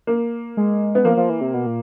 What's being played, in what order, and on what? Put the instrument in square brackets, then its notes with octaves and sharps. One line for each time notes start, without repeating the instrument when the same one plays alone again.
[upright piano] A#3
[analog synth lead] G#3
[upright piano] B3
[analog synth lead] F3 [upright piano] A#3
[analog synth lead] F3
E3
C3
B2
A#2